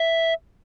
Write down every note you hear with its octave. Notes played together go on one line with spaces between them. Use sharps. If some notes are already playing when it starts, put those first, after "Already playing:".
Already playing: E5